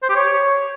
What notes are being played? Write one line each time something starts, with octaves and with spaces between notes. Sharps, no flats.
C5
G4
C#5